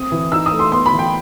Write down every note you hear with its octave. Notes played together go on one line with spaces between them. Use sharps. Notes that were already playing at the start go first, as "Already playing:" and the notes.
Already playing: C4 D#6
E3
D#4 E6
D#6
A3
C6
B3 C6
B5
E3
G5